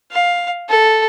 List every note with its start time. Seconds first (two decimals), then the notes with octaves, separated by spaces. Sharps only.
0.12 F5
0.69 A4